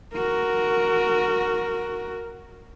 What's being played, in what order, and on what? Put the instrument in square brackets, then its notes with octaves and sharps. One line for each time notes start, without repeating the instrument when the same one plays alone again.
[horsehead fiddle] F#4 A#4